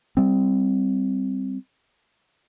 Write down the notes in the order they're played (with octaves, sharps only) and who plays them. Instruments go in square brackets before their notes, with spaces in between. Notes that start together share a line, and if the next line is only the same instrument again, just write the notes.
[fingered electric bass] G3 C4